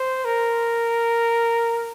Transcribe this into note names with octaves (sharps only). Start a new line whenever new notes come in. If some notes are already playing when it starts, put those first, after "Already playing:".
Already playing: C5
A#4